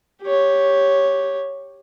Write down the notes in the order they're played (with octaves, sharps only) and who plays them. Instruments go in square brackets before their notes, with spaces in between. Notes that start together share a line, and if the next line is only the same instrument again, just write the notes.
[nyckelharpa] G4 C#5